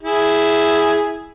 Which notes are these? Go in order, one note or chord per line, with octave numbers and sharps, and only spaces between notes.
E4 G#4